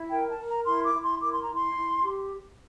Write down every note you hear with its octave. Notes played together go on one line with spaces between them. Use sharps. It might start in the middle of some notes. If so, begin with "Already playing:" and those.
Already playing: E4
A#4 G5
A5
A#4
A#5
E4 C6
D6
E4
C6
A#4 D6
C6
A#5
E4
C6
E4
G4